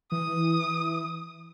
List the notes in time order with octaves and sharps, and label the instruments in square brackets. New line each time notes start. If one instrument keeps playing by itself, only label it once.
[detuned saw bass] E3 [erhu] D#6